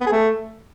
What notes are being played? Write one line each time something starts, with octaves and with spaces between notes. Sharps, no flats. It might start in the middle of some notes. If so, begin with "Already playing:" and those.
B3
G#4
A3